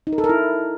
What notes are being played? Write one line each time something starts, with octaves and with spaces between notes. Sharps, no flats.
D#4
A#4
A4
A#4
E4